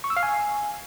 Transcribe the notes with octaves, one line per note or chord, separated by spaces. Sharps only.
C#6
E6
F5
G#5